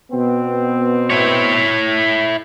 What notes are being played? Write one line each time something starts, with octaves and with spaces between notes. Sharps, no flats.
B2 B3 C4
E4 C#5